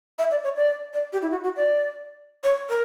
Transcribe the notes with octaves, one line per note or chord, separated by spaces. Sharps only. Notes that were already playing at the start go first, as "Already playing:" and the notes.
E5
D5
C#5
D5
D5
G4
E4
F#4
F#4
D5
C#5
A#4